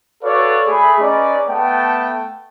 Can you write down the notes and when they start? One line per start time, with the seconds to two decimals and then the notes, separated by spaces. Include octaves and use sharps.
0.23 F#4 A4 B4 C#5 D5 F5
0.67 A3 G#4 A4 B5
1.00 C#4 D#4 G#4 B4 D5
1.50 A3 B3 G5 A5